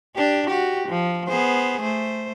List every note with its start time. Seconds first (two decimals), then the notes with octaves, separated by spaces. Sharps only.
0.16 D4 G4
0.48 F#4 G4
0.89 F3
1.28 B3 G#4 C5
1.82 A3 C5